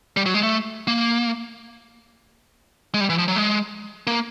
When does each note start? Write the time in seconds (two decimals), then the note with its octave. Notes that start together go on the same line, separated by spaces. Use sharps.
0.17 G3
0.26 F#3
0.34 G#3
0.43 A3
0.87 A#3
2.94 G#3
3.01 G3
3.09 E3
3.18 F3
3.28 F#3
3.36 G#3
4.07 A#3